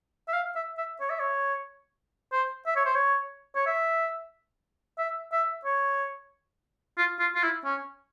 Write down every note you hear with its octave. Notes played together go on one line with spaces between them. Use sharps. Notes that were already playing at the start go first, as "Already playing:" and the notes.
E5
F5
E5
E5
C#5
E5
C#5
C5
E5
C#5
C5
C#5
C#5
E5
E5
E5
C#5
F4
F4
F4
E4
C#4